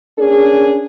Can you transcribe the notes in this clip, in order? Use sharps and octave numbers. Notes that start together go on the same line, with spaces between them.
A#3 C#4 D4 G#4